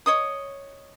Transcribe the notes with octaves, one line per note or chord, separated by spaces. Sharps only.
C#5 D#5 D#6